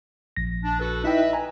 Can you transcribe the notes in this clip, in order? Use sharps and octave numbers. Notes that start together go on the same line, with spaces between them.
A#1 A#6
D4
F#4 A4 B4
D#4 E4 B4 D#5 E5 G5
G#5 A#5